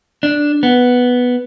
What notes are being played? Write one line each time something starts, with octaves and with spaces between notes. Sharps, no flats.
D4
B3